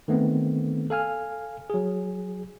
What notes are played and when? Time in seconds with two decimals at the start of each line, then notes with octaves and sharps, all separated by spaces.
0.08 D#3 A3 B3 C4
0.90 A4 F5 G#5 F6
1.70 F#3 G#4